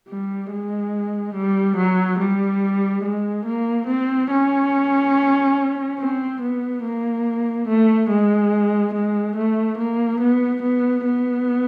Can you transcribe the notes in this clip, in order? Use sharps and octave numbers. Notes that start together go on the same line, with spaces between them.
G3
G#3
G3
F#3
G3
G#3
A#3
C4
C#4
C4
B3
A#3
A3
G#3
G#3
A3
A#3
B3
B3
B3